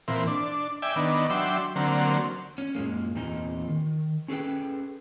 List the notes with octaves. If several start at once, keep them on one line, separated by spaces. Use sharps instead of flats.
A#2 E3 C4
D4
D5 E5 G5 G#5
D#3 B3 D4
F#3 D4 E5 G5 C6
D3 F#3 A#3 C4
C#4
F#2 A#2 G#3 A#3
E2 A#2 C4 D#4 D#5 G#5
D#3
C#4 G#4 A4 B4 G5